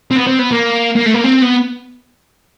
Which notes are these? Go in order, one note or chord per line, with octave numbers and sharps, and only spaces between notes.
C4
B3
C4
B3
A#3
A#3
A3
A#3
C4
B3